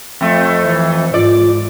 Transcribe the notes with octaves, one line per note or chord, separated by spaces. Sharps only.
F2 A3
E3
G#2 F4 D5